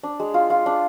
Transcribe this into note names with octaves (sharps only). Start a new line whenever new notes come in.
D4
G#3
F4
F4
D4